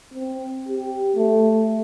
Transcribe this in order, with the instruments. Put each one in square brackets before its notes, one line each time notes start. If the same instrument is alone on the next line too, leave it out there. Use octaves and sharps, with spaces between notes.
[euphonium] C4
G4
A3